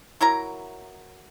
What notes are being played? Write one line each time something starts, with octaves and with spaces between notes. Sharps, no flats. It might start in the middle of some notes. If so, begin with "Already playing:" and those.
F#3 E4 A#4 A#5